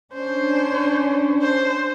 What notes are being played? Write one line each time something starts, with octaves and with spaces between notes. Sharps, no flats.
C#4 D4 C5
C5